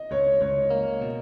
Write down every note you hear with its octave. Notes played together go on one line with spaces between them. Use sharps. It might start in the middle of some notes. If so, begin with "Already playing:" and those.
Already playing: D#5
C#2 C#5
C#2 C#5
A#3
B2